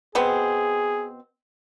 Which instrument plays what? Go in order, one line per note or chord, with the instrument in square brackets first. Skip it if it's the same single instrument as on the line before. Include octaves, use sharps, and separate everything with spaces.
[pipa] B2 B3 C4 [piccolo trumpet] G#4